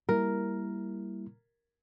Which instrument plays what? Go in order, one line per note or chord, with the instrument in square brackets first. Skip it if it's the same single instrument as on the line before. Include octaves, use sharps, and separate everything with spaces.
[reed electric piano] G3 A#3 E4 [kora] A#4